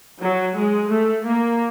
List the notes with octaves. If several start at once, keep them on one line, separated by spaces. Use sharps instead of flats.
F#3
G#3
A3
A#3